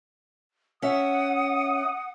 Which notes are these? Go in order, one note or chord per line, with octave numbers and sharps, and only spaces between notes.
C#4 E5 F#5 D#6